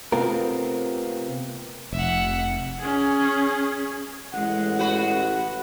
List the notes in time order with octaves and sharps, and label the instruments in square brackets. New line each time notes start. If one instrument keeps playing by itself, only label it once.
[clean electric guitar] C3 A3 B3 C4 F4 A#4
[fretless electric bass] F1 [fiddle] E5 F#5
[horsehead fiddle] C#4 G#4
[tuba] A1 [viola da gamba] G#3 [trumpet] F#5
[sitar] F#4 B4 [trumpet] F#5